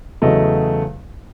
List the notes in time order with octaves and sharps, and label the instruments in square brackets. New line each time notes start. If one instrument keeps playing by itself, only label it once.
[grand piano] E2 C#3 F#3 A3 D#5